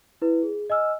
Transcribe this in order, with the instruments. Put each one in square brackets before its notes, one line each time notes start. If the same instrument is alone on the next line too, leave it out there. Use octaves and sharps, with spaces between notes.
[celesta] E4 B4
G#4
D#5 G#5 E6 F6